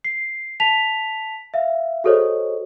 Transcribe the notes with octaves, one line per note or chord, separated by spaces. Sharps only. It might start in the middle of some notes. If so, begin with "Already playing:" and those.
C7
A5 B6 F7
E5 F5
F#4 G#4 A4 C5 C#5 D#5